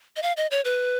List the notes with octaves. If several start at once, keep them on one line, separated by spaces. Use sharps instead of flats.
D#5
F5
D#5
C#5
B4